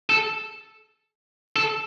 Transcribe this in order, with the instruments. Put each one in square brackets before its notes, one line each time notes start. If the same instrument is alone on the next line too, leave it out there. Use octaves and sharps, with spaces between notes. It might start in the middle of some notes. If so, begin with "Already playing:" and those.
[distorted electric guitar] A4
A4